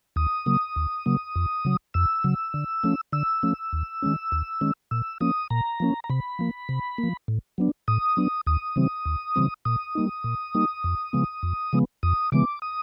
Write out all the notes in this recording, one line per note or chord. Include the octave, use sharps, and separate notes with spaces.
D#2 D#6
C#3 F#3 A#3
D#2
C#3 F#3 A#3
F2
C#3 F#3
F2 E6
C#3 F#3
D3
F3 A3 C#4
D3 E6
F3 A3 C#4
D#2
D#3 G#3 C#4
D#2
D#3 G#3 C#4
A#2 E6
F3 A#3 C#4 D#6
A#2 A#5
F3 A#3 C#4
A#5
C3 B5
F3 A#3
C3
A#3
F3
A2
F#3 B3 D4
A2 D#6
F#3 B3 D4
D#2 D#6
C#3 E3 G3 C4
D#2
C#3 E3 G3 C4
A#2 D#6
G3 A#3 D#4
A#2
G3 A#3 D#4
F2
C#3 F3 G#3 B3
F2
C#3 F3 G#3 B3
F2 D#6
C#3 E3 G#3 B3 D6
D#6